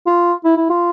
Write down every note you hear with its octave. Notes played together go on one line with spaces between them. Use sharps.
F4
E4
E4
F4